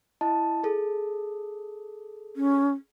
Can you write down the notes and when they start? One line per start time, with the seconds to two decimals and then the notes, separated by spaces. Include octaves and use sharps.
0.21 E4 D#5 A5
0.64 G#4 A4
2.36 C#4